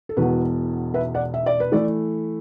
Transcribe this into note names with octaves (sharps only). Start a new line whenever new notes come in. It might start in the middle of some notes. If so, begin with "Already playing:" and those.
A4
E1 E2 B2 F#4 B4
B4 E5
D5 F#5
E5
D5
B4
E3 A3 A4 D5